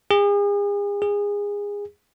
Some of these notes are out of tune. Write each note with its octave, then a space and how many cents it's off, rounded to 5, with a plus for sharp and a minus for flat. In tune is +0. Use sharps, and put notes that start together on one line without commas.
G#4 -40
G#4 -25